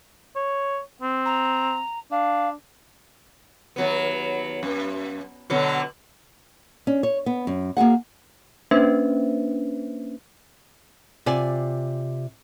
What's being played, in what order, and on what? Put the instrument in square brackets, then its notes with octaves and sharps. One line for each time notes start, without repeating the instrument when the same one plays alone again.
[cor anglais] C#5
C4
[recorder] A#5
[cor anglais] D4 [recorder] F5
[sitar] D#2 F#3 B3
F#2
B2 D3 F#3
[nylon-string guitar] C#4 D4
C#5
B3
F#2
A#3 F#4 G#4 F#5
[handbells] A#3 C#4 D4 B4 C5 E5
[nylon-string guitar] C3 F4 D5 G#5